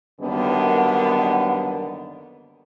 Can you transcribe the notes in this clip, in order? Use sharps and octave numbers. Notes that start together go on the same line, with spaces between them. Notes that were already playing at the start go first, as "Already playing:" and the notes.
F#2 D3 D#3 G3 A#3 B3